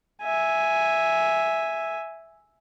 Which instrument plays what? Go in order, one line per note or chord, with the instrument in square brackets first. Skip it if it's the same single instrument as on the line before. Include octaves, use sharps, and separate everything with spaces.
[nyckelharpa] E5 G#5